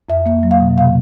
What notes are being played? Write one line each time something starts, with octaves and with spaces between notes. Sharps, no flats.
F2 E5
A#3 E5
F#3
F5
B2
C3 F5